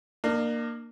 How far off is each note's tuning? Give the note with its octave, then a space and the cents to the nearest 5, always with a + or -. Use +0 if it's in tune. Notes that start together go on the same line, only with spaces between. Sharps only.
A#3 +0 D4 +40